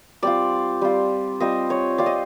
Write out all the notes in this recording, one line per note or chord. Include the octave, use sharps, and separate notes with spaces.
G3 C4 F4 D5
G3 C4 F4
G3 C4 F4 D#5
C#5
G3 C4 F4 D5
D#5